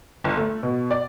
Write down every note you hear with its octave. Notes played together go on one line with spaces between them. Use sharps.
G1
A3
B2
D5